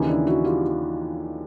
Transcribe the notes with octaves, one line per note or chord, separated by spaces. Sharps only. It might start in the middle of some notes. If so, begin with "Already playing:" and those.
Already playing: D#2 C#3 E3 C#4 D#4
D4 E4
E4 F#4
F4 G4